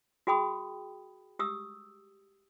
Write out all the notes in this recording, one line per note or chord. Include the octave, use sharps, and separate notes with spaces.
F#4 G#4 G5 B5 D#6
G4 D#6 E6